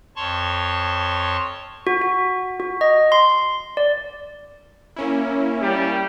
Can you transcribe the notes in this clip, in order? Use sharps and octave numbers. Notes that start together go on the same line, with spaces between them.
F2 C#5 A5 C6 C#6
F#4
F#4
F#4
D#5
C6
D5
A#3 C#4 E4
G3